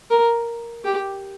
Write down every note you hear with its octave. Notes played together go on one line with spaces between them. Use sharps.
A#4
G4